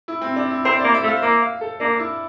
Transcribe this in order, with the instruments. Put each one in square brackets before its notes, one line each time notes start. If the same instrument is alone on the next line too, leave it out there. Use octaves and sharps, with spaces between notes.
[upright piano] E4
C4
D4
E4
[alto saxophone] C4 [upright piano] C5
[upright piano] E5
D5
[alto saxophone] A#3
[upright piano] E5
[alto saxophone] A3
[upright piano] F5
[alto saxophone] A#3 [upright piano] E5
[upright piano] F5
A4
[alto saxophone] A#3 [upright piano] D4
[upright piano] E4